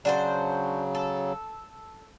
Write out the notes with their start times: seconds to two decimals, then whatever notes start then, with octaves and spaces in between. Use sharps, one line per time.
0.05 C#3 F#3 D4 F#4 C5
0.95 A4